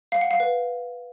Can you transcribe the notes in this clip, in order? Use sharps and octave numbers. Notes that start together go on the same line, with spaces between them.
F5
F#5
F5
B4